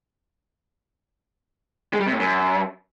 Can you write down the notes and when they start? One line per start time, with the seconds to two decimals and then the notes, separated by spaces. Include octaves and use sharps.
1.94 G#3
2.00 G3
2.07 C3
2.13 A2
2.19 F#2